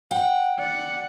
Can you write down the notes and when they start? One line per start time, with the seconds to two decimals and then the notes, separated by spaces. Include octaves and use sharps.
0.11 F#5 G5
0.59 D5 F#5